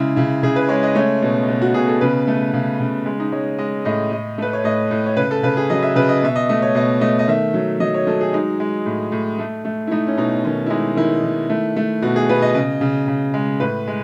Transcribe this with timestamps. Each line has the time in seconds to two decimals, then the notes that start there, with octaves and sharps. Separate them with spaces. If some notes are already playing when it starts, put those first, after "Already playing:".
Already playing: C#3 G#3 E4
0.16 C#3 E4
0.43 C#3 G#4
0.56 B4
0.69 G#3 C#5
0.83 D#5
0.95 A3 C#5
1.22 B2
1.48 B2
1.62 F#4
1.74 B2 G#4
1.88 A4
2.01 C#3 B4
2.27 A3
2.54 C#3
2.80 C#3
3.06 G#3
3.20 D#4
3.32 G#3 C#5
3.59 G#3 D#5
3.85 A2 D#5
4.12 A2 D#5
4.38 A3 B4
4.53 C#5
4.64 A2 D#5
4.91 A2
5.06 C#5
5.17 C#3 B4
5.31 A4
5.43 C#3 B4
5.57 G#4
5.70 F#3 D#5
5.83 E5
5.96 C#3 B4
6.09 D#5
6.23 B2 E5
6.36 D#5
6.49 A3 D#5
6.62 C#5
6.75 B2 D#5
7.01 A3 D#5
7.19 D#5
7.27 D#3 E5
7.54 F#3
7.80 F#3 D#5
7.94 C#5
8.07 F#3 A4
8.21 G#4
8.33 G#3 D#4
8.60 G#3
8.86 A2
9.12 A2
9.39 A3
9.65 A3
9.87 E4
9.91 A3 D#4
10.07 C#4
10.17 B2 D#4
10.44 D#3 C#4
10.66 E4
10.70 G#3 D#4
10.96 D#3 E4
11.23 D#3
11.50 A3
11.76 A3
12.02 B2 F#4
12.16 G#4
12.29 B2 B4
12.42 D#5
12.55 C#3 D#5
12.81 C#3
13.08 C#3
13.34 G#3
13.60 A2 B4
13.88 G#3